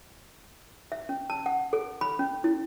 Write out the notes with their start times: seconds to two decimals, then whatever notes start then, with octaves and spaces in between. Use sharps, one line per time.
0.92 E5
1.09 C#4
1.30 A5
1.46 F#5
1.73 A4
2.01 B5
2.19 C#4
2.44 E4